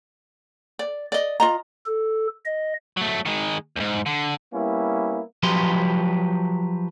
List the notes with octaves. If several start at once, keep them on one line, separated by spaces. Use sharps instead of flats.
D5
D5 D#5
F4 D#5 A#5
A4
D#5
F#3 A3
D#3 G#3
D2 G#2
D3
G3 A#3 B3 C#4 E4
F3 F#3 G4 B4 C6